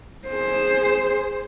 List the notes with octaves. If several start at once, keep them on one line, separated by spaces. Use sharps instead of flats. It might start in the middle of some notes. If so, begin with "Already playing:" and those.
G#4 C5